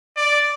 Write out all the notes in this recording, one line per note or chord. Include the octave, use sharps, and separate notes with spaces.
D5